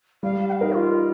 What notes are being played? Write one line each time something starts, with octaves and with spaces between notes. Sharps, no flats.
G3 F5
G5
F5
D#4 A#4
F4